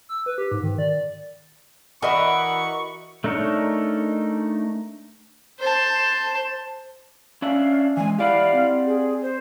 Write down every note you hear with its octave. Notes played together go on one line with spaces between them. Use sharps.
E6
B4
G4
G#2
D#3
D5
E3 F#4 A#4 D#5 E5 B5 C#6
A3 D4 D#4 A#4 C#5
C5 A5
C#4 D4 E5 F5
E3 G#3 G#5
E4 G4 D5 F5 F#5
C4
G#4
C5